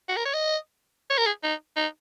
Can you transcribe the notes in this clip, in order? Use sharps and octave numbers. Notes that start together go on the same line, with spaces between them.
F#4
A#4
C#5
D#5
C#5
A#4
G#4
D#4
D#4